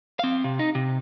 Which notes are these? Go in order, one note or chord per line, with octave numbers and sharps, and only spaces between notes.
C4 F5
C3
D#4
C3